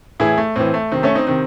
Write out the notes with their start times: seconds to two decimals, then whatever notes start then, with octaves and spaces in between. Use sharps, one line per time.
0.20 A2 E3 E4 G#4
0.38 A3
0.56 A2 E3 C4
0.74 A3
0.92 C3 D#3 C4
1.03 A3 C#4
1.15 C4 D#4
1.27 C3 D#3 C4